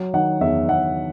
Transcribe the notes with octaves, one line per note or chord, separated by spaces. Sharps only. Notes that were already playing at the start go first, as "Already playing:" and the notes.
Already playing: F#3
D#3 F#5
E2 E5
E2 F#5